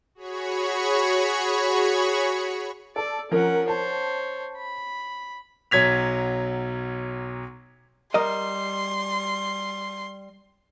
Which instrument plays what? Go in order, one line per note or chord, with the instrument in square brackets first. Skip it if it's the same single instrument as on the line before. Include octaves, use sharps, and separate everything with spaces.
[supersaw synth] F#4 G#4 C#5 B5 C#6
[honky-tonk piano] A4 [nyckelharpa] D5
[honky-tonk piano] F3 A#4 [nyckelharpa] C#4 F#5
[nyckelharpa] C5 C#5 [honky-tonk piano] A5
[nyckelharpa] B5
[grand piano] B1 F#3 G#6 B6 F7
[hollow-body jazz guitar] G3 A#4 D#5 [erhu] C6